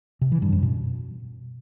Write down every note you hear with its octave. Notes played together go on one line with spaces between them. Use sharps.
C3
E3
G2
F#2
B2